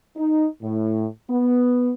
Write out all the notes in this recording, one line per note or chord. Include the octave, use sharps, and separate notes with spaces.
D#4
A2
B3